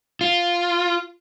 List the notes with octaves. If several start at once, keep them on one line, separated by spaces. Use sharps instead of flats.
F4